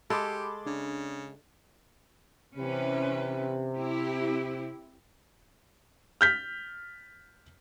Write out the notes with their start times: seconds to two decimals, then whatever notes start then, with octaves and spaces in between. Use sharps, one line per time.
0.10 G#3 G4 A4 B5 C6 D6
0.66 C#3 D4
2.57 C3 E3 C#4 B4
3.77 C4 E4 G4
6.21 F6 G6 B6